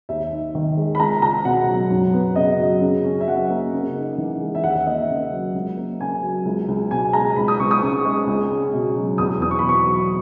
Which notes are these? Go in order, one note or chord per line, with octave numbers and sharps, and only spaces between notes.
D#2 E5
D#4
D#3
G#3
B5
C#2 A#5
C#2 A#5
B2 F#5
F#3
F#2
B3
C#3 D#5
F#3
C#3
C#4
E5
F#3 F#5
A#3
C#3
D#4
E3
G#3
E5
D#2 F#5
E5
A#3 D#5
E5
C#3
F#3
C#2
A#3
C#3 G#5
F#3
C#2
C#2
B2 G#5
G#3 A#5
C#2 B5
D#6
C#2 C#6
D#6
C#3 C#6
G#3
C#2
C#4
B2
F#3
E2 D#6
E2 D#6
C#6
B5
B2
C#6
F#3